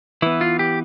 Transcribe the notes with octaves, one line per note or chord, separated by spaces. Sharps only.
E3 B3 E4
F4
G4